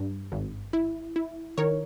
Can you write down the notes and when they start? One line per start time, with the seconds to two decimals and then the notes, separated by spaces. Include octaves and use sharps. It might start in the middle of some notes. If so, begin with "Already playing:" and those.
Already playing: G2
0.32 G#1
0.73 E4
1.16 E4
1.58 D#3 A#4 C#5